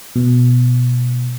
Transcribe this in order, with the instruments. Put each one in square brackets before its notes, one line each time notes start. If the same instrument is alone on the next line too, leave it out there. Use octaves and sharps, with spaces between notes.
[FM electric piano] B2